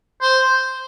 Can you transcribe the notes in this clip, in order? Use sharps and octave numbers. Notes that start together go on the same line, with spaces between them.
C5